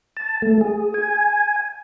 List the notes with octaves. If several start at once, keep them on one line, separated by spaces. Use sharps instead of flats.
A5
A3
G#4
G#5